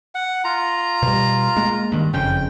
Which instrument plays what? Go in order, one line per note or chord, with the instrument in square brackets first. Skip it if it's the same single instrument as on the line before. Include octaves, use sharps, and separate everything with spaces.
[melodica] F#5
F4 A#5
[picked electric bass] B2 G3
G#3 A#3
G2 D#3
[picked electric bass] F#1 F2 C#3 [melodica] G5